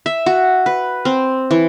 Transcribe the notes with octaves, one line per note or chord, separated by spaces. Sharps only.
E5
F#4
B4
C4
E3